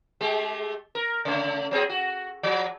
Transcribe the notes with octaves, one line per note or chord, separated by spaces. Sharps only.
G#3 A3 G4
A#4
C#3 A3
F#3 C4 G#4
F#4
F3